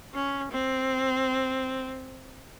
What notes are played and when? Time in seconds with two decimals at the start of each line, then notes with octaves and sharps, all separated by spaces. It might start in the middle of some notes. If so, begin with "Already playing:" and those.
0.14 C#4
0.51 C4